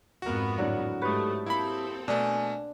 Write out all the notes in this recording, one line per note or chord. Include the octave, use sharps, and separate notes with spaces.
F2 G#2 B3 F#4 A#4
A2 D3 F#3
G#2 A3 G4 B4 C#5 D#6
A#3 C4 E4 A4 B5
B2 A3 D4 G#5